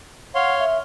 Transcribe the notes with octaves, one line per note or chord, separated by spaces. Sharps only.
C#5 F5 F#5 C6
E5